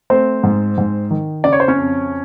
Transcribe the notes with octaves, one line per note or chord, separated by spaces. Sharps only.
A3 C4 C5
G#2
G#2
D#3
C#3 D5
C#5
C5
C#4 C#5
F2